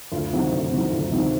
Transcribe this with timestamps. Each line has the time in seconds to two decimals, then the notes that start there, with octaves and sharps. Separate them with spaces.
0.12 D2 F4
0.33 C3 D#3 F#3
0.52 D2
0.72 C3 D#3 F#3
0.92 D2 F4
1.12 C3 D#3 F#3